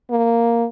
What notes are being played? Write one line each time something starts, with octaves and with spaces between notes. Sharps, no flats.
A#3